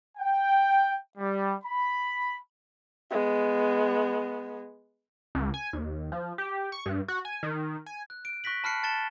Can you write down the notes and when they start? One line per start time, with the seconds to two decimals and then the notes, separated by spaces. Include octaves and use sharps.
0.18 G5
1.18 G3
1.64 B5
3.11 G#3 B3
5.35 C#2
5.54 G#5
5.73 D#2
6.12 F3
6.38 G4
6.72 C#6
6.86 G2
7.08 F#4
7.25 G#5
7.43 D#3
7.86 G#5
8.10 F#6
8.25 D7
8.44 C#6 F#6 A#6 B6 F#7
8.64 A5 B5 F6 F#6 C7 C#7
8.83 A5 A6 C#7 E7 G7